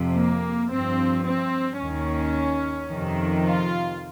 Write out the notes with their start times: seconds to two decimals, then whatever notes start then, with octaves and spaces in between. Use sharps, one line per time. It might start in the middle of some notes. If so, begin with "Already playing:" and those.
Already playing: F2 C3 F3
0.14 A#3
0.70 G2 F3 C4
1.25 C4
1.80 D#2 D#3 C#4
2.90 F2 C3 D#3
3.45 F4